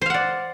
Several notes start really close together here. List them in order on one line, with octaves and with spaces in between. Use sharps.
C5 F5 F#5 D5